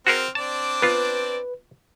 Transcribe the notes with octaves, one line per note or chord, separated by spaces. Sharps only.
C4 F#4 G#4 A#4 F6
C4 D4 D5 A5
B3 F4 B4